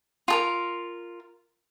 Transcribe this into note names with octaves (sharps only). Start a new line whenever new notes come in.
F4 G#4 A#4